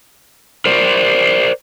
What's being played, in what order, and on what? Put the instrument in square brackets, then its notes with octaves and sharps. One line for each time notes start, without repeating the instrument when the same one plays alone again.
[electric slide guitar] A#4 C5 D5